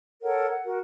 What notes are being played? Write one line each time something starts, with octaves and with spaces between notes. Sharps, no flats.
A4 A#4 C#5 F#5
F#5
F#4 A#4